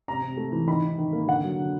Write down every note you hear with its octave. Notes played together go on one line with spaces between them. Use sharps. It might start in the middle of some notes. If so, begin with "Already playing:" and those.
C3 A#5
C3
A3
E3
D#3 B5
D#3
D#3
A#3
D3 F#5
F#3
D3